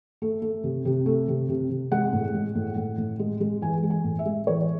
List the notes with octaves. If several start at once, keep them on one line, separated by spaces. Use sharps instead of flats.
A3
A3
C3
C3
A3
C3
C3
C3
G#3 F#5
A2
G#3
A2
A2
A2
G#3
G#3
E3 G#5
G#3
G#5
A2
E5
G#3
E3 C#5